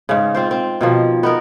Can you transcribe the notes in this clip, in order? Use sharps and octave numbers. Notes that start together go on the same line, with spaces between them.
G#2 C#3
C4 F4 C5
C4
B2 D#3 F3
B3 D#4 A#4